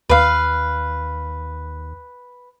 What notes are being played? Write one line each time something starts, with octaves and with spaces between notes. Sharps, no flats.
D#2 B4 F5